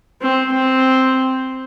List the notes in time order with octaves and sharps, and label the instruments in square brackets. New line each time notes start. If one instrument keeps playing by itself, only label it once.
[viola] C4
C4